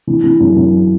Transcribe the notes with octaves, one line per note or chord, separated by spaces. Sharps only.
E3
E3
F#2
F#2